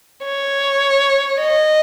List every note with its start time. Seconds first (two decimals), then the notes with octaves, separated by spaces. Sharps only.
0.24 C#5
1.40 D#5